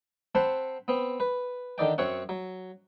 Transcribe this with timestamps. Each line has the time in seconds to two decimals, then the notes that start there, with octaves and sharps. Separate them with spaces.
0.35 C4 C5 F#5 A5 B5
0.88 B3 C4
1.20 B4
1.78 D3 D#3 D5 G5
1.98 F#2 C4 C#5 F#5
2.29 F#3